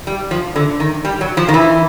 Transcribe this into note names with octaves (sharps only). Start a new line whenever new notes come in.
G3
F3
D3
D#3
G3
F#3
F3
D#3
E3